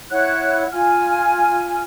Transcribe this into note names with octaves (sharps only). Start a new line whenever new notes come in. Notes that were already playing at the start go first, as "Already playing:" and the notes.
E4 C#5 F#5 F#6
F4 G#5 F6